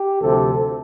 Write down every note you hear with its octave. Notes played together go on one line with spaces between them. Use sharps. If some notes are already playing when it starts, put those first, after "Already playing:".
Already playing: G4
D2 C3 F3 A4